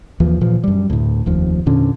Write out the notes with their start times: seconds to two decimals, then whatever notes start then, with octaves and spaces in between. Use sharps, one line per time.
0.20 D#2 E3 F3
0.41 A#2 E3 F3
0.64 F#2 G3
0.90 D2 A2
1.26 F1 D#2 F3
1.66 E2 A#2 D3 C#4